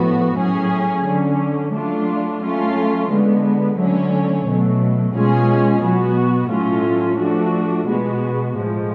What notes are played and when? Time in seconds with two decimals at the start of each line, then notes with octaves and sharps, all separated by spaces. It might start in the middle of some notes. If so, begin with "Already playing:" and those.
Already playing: A2 F3 B3 F#4
0.35 A2 F#3 C#4 G#4
1.04 D3 F#3 C#4
1.72 F#3 A3 D4 F4
2.40 F#3 A3 C#4 F4
3.09 D3 G#3 B3
3.77 D3 F#3 A3 C#4
4.45 B2 F#3 A3
5.13 B2 G#3 C#4 F4 G#4
5.82 B2 F#3 B3 F#4
6.50 A2 F#3 A3 C#4 F4
7.18 F3 A3 D4 F#4
7.87 B2 G#3 B3 F#4
8.55 A2 F3 G#3